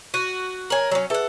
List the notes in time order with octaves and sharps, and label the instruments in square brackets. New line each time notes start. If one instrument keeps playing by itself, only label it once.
[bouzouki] F#4 [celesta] D#7
[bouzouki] A#4 G#5 [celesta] C#5 F#7
[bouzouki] F#3 C#4
[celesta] G#4 B4 E5 [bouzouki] A4 F#5